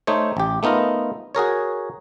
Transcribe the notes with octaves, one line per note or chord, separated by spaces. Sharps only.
A3 D#4 C5 C#5
A1 G4
A3 B3 D#4 F4 A#4
F#4 G#4 A#4 C#5